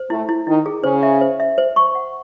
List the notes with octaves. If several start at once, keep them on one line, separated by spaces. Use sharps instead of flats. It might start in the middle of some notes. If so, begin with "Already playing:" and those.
Already playing: C5
A2 A3 E4
E4
D#3 D#4 E4
G#4
C#3 C#4 C5
E5
C5
E5
C5
C#6
F#5